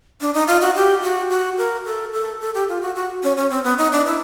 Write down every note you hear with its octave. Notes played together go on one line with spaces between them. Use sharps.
D4
D#4
F4
F#4
G4
F#4
F#4
A#4
A4
A4
A4
G4
F4
F#4
F#4
C#4
C#4
C4
B3
D#4
D4
E4